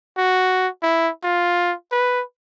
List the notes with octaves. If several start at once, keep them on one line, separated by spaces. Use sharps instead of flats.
F#4
E4
F4
B4